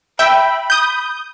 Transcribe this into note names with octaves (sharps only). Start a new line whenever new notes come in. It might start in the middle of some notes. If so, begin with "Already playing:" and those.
E5 G5 B5
D#6 G6